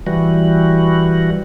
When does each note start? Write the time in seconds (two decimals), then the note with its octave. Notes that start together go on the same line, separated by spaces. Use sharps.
0.07 E3 G3 F#4